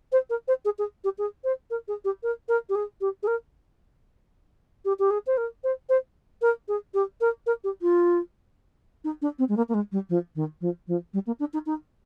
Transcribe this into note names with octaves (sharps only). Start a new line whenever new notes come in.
C5
A#4
C5
G#4
G#4
G4
G#4
C5
A#4
G#4
G4
A#4
A#4
G4
G#4
G4
G#4
A#4
G4
G4
G#4
C5
A#4
C5
C5
A#4
G#4
G4
A#4
A#4
G4
F4
D#4
D4
C4
G#3
A#3
A#3
G#3
G3
F3
D#3
F3
F3
G3
A#3
D4
D#4
D#4